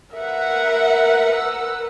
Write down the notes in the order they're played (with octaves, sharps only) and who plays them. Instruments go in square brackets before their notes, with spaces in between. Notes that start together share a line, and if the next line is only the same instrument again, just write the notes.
[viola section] A#4 B4 F#5 [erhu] E5
[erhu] E6